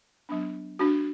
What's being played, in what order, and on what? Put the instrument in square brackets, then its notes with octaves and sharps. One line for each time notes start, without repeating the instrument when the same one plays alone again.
[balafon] F#3 B3 D4
D4 F#4